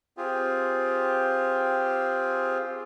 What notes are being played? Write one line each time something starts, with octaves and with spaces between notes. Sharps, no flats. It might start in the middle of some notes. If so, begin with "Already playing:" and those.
C4 F4 G4 G#4